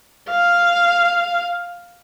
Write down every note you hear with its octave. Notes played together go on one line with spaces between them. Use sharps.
F5